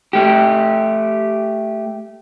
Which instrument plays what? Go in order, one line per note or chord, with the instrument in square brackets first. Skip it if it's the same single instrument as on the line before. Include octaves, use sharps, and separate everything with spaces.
[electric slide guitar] A3 G4